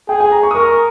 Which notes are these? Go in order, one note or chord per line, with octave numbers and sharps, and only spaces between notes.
G#4 G5
G#5
A#5
C#6
D#6
A#4 C#6